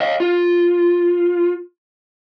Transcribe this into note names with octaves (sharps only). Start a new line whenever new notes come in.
D#5 F5
F4